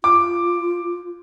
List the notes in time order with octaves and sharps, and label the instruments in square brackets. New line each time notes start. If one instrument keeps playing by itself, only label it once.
[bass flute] F4 [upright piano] D6